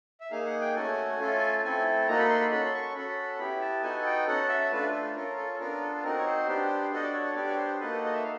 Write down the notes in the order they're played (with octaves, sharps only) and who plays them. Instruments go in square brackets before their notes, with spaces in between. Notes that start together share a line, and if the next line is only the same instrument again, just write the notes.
[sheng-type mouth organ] E5
A#3 D#4 G#4 F5
F#5
G5
A3 C#4 F#4 A4 G#5
A3 C#4 F4 A4
A3 C4 E4 A4 G#5
A#3 D#4 F#4 A4 A#5
B5
C6
B5
C#4 F#4 A4 B5
C6
C#6
C#4 F#4 A4 B5
B3 E4 G4 B5
A5
B3 D#4 F#4 A4 G#5
G5
C#4 F#4 A4 F#5
E5
A3 D4 F4 B4
A4
C#4 F4 A4 A#4
A4
A4
B3 D4 F4 A#4
A4
C4 D#4 F#4 A#4
C#5
C5
B3 D4 G4
D4 F#4 A4 D#5
D5
C#5
B3 D4 G4 D5
C#5
C5
A#3 D#4 F#4 A4 B4
D#5
E5
F5